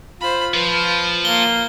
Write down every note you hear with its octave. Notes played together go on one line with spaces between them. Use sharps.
F4 C5 B5
F3 B4
A#3 G7